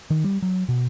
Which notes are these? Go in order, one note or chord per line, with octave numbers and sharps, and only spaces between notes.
D#3
G3
F#3
B2